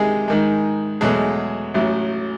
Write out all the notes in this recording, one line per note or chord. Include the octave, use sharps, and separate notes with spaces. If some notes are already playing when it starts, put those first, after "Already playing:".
Already playing: C2 C3 D#3 G3 G#3 G#4
G#2 D#3 G#3
E2 B2 F#3 G#3 A3 G#4
A1 A2 F#3